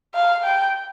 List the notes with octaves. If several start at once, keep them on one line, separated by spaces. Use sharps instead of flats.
F5
G5